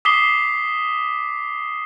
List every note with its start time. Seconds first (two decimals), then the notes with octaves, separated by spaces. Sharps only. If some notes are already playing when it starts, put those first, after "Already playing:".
0.05 D6 D#6 B6 C7 G7